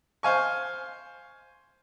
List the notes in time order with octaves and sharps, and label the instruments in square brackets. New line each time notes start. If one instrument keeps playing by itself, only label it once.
[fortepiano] C5 F5 G#5 C#6